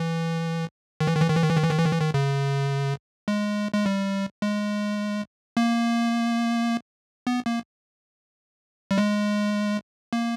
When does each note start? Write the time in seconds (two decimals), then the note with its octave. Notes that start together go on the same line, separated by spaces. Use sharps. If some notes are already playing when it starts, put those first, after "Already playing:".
Already playing: E3
1.00 D#3
1.07 E3
1.15 D#3
1.21 E3
1.29 D#3
1.35 E3
1.42 D#3
1.50 E3
1.57 D#3
1.64 E3
1.70 D#3
1.78 E3
1.85 D#3
1.92 E3
2.00 D#3
2.14 C#3
3.28 G#3
3.74 G#3
3.86 G3
4.42 G#3
5.57 A#3
7.27 B3
7.46 A#3
8.91 G3
8.98 G#3
10.13 A#3